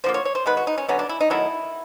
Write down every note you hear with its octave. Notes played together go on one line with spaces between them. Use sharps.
D3 F3 A#3 C5
C#5
C#5
C5
D#3 G#3 B3 B4
F#4
D#4
C#4
D3 F#3 B3 C#4
D4
E4
D#4
D#3 F#3 A3 E4